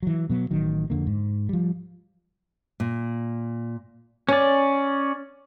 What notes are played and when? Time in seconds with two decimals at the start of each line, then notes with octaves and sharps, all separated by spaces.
0.03 E3 F#3
0.30 B2 F#3 B3
0.51 A1 D#3 F#3
0.90 F2 D3 A#3
1.07 G#2
1.49 F3 G3
2.80 A#2
4.29 C#4 C#5 D5